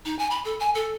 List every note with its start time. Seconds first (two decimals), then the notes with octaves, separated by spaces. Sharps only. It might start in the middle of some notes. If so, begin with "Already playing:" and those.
0.05 D#4
0.19 G#5
0.31 B5
0.45 A4
0.60 G#5
0.75 A4